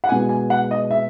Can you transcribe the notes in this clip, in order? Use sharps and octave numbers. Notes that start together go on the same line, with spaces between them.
F#5
B2 G#3 B3 E4 G#5
G#5
F#5
D#5
E5